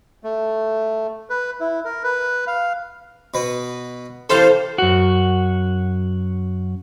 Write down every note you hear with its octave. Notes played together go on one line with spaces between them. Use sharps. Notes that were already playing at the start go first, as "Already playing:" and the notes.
A3
B4
E4
A#4
B4
F5
B2 B4
C3 E3 A4 C5 F5
F#2 F#4